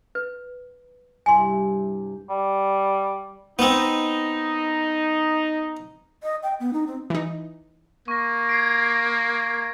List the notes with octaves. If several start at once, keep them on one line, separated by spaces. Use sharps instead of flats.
B4
G2 C3 E4 G#5 C6
G3
B3 C4 D#4
D#5
G5
B3
D#4
C4
E3 D#4
A#3 C#6 A#6
G#6 C7 D7